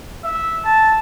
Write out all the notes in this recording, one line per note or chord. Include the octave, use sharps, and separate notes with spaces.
E5
A5